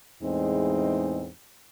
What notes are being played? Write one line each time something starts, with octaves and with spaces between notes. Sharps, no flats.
E2 A2 G#3 C4 D#4